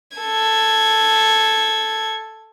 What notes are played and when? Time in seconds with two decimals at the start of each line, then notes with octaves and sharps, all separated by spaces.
0.18 A4 G#6